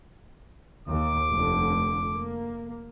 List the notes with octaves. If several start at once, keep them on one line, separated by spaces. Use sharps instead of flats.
D#2 D6
F1 D3
A#3